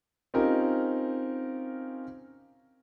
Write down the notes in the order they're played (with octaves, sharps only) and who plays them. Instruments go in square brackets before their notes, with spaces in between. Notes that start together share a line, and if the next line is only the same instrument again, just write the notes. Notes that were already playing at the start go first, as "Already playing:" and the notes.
[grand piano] C4 C#4 D#4 F4 G4 A#4